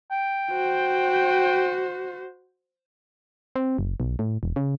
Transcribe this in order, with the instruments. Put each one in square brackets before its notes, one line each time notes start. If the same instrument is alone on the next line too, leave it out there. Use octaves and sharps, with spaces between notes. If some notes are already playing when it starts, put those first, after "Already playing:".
[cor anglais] G5
[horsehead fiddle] F#4 C5
[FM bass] C4
F#1
B1
A2
E1
C#3